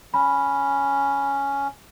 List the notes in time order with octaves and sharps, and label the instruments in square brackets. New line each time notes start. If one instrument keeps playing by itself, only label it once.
[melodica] C#4 [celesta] B5